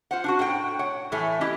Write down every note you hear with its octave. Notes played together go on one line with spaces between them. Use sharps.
F4 C5 F#5
D4 F4 F#4
A2 F#5 G5
C#5 F#5
A2 E3 A3 G#5
E4 G4 D#5